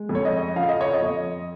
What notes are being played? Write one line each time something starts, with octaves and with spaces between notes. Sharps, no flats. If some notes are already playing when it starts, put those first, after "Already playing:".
Already playing: G#3
F2
C#5
D#5
F3 F5
D#5
C#5
D#5
F2